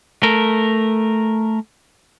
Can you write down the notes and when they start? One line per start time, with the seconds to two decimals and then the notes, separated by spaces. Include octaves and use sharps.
0.23 A3 A#4